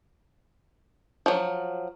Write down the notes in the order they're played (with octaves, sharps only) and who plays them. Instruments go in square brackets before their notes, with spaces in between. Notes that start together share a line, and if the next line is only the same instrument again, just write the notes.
[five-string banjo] F3 F#3